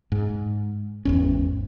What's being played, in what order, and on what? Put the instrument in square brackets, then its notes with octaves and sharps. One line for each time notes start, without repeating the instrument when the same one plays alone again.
[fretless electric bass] G#2
G#1 E2 C#4